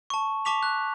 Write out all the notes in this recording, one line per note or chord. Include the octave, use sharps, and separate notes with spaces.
A5 C#6
A5 C#6 D6 B6 F7
F#6